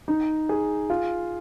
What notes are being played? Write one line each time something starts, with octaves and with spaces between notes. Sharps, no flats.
D#4
G#4
F4